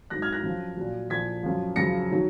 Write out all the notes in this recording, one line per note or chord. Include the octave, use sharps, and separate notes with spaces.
G#2 F#3 F#6 A#6
F6 G#6
F#6 A#6
F#2 F3
A#2 F#3
A#2 F3 G#6 B6
F#2 F3
F#2 C#3 F3 A#6 C#7
D#3 F#3